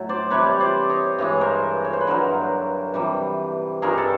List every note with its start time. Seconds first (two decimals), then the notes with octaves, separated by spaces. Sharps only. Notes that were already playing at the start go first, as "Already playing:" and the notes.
Already playing: A2 F#3
0.09 C5 D5
0.30 C3 E3 G3 B4 C#5
0.60 C5 D5
0.89 C#5 D#5
1.18 G2 E3 G#3 C#5 D#5
1.41 A#4 C5
1.85 C#5
1.93 C5
2.01 B4
2.07 G2 D3 F#3 A#4 C5
2.94 C3 E3 G3
3.82 G2 D#3 G3 G#4 A#4
3.98 A4